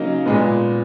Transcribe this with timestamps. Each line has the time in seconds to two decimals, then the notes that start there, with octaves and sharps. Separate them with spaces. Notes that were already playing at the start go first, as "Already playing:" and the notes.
Already playing: C#3 F#3 A#3 D#4
0.26 A#2 G#3 B3